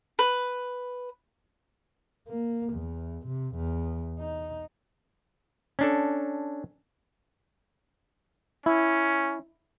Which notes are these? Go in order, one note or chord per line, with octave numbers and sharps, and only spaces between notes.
B4
A#3
E2
C3
E2
D#4
C#4 D4 A4
C#4 E4